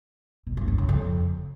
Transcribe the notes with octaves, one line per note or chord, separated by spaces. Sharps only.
B2
G2
G2
C#3
F2